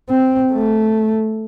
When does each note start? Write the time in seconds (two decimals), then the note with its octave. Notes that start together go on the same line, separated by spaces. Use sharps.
0.10 C4
0.52 A3